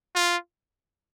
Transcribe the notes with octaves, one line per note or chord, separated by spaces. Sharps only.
F4